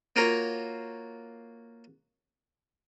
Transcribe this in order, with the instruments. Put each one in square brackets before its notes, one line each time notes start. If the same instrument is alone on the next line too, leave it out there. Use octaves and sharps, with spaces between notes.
[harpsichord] A#3 F4 F#4 A#4 C#5 A#5